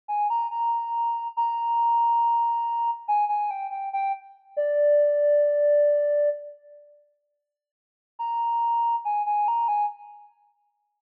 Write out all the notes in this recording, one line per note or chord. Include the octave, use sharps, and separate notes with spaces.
G#5
A#5
A#5
A#5
G#5
G#5
G5
G5
G5
D5
A#5
G#5
G#5
A#5
G#5